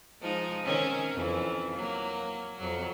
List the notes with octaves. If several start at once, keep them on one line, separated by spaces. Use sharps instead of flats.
F3 G#3 D#4
D#3 C4 C#4
F2 E3
F#3 A#3
F2 F#3